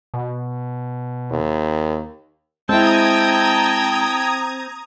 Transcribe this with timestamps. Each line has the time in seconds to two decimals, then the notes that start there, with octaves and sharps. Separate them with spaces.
0.14 B2
1.31 D#2
2.69 G#3 C4 E4 G5 A5 A#5 D#6 G#6